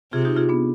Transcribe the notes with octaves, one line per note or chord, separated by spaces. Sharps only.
C3 F4 G#4
D#4 G4
F4 G#4
B3 D4